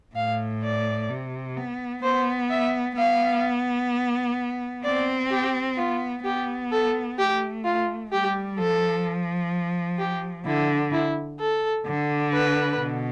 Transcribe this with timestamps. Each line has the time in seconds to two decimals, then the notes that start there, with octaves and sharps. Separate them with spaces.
0.15 A2 F5
0.63 D5
1.10 C3
1.57 B3
2.03 B3 C5
2.50 E5
2.97 B3 F5
4.84 C4 D5
5.31 G4
5.77 B3 F4
6.24 B3 G4
6.72 A4
7.18 A3 G4
7.64 F4
8.11 G3 G4
8.58 F3 A4
9.99 G4
10.46 D3 E4
10.93 E4
11.40 A4
11.87 D3
12.33 B4
12.79 B2